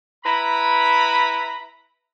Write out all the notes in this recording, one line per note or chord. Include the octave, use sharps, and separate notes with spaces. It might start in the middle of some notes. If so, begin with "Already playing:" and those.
E4 B4 A#5 B5